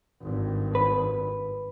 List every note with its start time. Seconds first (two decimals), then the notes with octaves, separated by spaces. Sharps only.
0.22 G#1 G2
0.75 B4